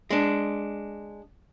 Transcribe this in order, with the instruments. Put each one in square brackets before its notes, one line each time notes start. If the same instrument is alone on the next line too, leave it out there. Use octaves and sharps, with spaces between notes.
[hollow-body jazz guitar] G#3 D4